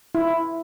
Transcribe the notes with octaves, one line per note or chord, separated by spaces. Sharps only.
E4